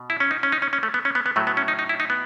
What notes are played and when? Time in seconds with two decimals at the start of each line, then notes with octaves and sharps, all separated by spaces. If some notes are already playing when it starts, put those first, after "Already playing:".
Already playing: B2
0.10 E4
0.20 C#4
0.31 D#4
0.43 C#4
0.52 D#4
0.62 C#4
0.73 C#4
0.83 A3
0.94 B3
1.05 C#4
1.15 B3
1.26 B3
1.36 A2 F#3 A3
1.47 B3
1.57 C#4
1.68 D#4
1.79 D#4
1.89 E4
2.00 D#4
2.10 B3